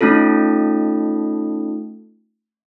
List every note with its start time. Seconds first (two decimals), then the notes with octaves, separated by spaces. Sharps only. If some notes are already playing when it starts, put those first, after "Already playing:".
0.01 A3 C#4 D#4 F4 A4